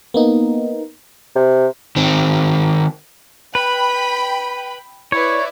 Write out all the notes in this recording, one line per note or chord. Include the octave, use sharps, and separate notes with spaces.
A#3 B3 D#4
C3
D#3 C4
B4 G5 B5
E4 B4 C#5 D5